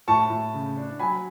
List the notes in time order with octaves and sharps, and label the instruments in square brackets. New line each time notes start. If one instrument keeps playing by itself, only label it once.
[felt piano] A2 [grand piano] A5 C#6
[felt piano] A2
C#3
D4
[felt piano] F#3 [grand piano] G#5 B5